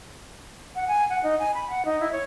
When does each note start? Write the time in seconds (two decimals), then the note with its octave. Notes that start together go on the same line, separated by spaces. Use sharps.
0.75 F#5
0.88 G#5
1.09 F#5
1.23 D#4
1.39 G#5
1.54 B5
1.70 F#5
1.85 D#4
2.00 E4
2.12 C#5